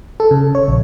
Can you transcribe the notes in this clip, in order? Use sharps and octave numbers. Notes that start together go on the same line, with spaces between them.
A4
C#3
C#5
A#1